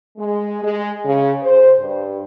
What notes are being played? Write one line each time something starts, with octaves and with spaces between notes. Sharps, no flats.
G#3
G#3
C#3
C5
G2